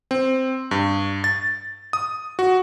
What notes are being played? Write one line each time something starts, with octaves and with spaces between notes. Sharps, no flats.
C4
G2
A6
D#6
F#4